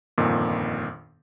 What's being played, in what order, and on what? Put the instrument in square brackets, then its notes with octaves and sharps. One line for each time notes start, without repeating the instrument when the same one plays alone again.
[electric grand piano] G1 F2 A#2 D#3